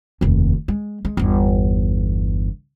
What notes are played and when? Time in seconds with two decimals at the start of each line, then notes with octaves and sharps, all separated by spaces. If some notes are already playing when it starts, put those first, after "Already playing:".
0.21 F1 D#2
0.68 G#3
1.05 G#3
1.17 G1 E2